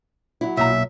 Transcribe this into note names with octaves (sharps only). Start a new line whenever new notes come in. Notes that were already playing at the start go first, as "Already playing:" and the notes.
F#3 E4
B1 A#2 E5 A#5